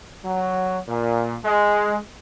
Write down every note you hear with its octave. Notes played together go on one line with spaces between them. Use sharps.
F#3
A#2
G#3